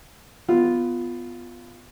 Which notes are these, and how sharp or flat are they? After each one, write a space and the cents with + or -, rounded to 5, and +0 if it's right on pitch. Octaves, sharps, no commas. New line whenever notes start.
B3 +10 F4 +0